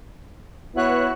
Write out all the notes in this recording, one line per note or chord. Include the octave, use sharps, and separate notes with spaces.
B3 E4 F#4 B4 C#5 F#6